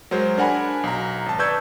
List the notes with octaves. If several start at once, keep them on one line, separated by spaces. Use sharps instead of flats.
F#3 G#3 A#4 C5
D4 A#4 F#5 G#5 B5
B1 A#5
G#1 A5
B4 D5 C#6 E6 G6 G#6